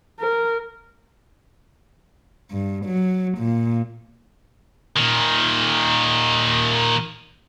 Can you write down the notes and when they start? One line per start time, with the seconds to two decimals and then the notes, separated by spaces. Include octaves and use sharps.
0.20 A#4
2.51 G2
2.86 F#3
3.38 A#2
4.96 A#2 D#3